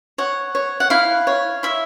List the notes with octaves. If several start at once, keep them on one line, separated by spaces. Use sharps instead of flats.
C#5 F#5
C#5
F#5
E4 F5
C#5
E4 E5